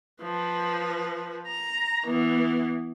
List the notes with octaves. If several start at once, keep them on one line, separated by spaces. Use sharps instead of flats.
F3 B4
A#5
E3 B3